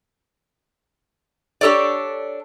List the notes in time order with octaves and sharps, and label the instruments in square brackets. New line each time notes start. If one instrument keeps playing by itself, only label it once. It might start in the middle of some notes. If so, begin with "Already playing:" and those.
[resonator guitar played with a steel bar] D4 G4 A4 C#5 D5